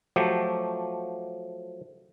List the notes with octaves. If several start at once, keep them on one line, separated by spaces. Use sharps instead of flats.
F3 F#3 A3 G4